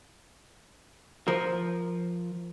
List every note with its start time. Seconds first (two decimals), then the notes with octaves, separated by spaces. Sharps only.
1.28 F3 A#4